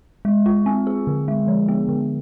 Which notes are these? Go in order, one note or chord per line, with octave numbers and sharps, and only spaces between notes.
G#3
F4
C4
G#4
D3
G#3
F3
B3
D3